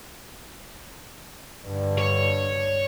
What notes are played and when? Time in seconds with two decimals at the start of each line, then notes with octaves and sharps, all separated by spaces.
1.66 G2 D3
1.98 C#5